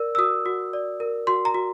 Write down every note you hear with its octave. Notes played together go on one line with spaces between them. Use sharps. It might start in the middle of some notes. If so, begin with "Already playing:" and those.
Already playing: A#4 D5 E6
E6
F#4 D#6
F#4
D5
A#4
F#4 C6
A#5
F#4